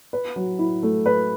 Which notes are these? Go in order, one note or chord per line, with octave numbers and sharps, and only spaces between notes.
B4
F#3
E4
A3
B4